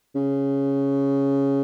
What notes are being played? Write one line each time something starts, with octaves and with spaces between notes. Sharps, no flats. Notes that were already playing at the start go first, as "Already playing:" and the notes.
C#3